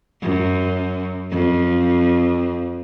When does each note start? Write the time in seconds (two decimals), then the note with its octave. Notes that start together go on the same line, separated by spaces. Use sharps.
0.22 F#2
1.31 F2